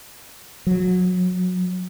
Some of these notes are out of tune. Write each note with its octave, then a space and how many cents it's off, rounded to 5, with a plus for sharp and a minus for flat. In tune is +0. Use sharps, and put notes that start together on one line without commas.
F#3 -25